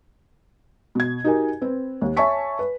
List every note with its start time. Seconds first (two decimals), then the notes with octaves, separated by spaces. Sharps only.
0.95 B2 G#6
1.24 D#4 F#4 G4 A#4 G#5
1.62 C4 B4
2.02 D#2
2.17 C#5 E5 G#5 A5 C#6 B6
2.59 B4